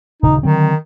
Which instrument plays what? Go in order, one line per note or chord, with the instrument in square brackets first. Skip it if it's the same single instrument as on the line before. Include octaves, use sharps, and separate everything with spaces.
[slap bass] D#1 C#3 [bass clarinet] D#4
[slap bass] D3 F#3 C4 [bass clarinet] D#3